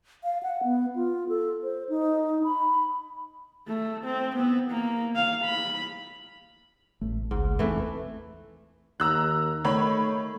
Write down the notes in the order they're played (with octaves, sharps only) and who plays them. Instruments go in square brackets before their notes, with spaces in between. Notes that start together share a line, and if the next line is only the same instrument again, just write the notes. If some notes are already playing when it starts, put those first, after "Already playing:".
[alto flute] F5
F#5
B3
F4
A4
C5
D#4
B5
[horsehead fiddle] A3
C4
B3
A#3
F5
B5
[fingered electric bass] A1 A3
[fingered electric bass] G#1 C#2 [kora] G#2
[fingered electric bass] E2 B3 C4 [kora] E3 A3 D4
[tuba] D#2 [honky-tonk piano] A#5 E6 F#6
[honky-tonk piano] D#3 C#5 B5 [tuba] A3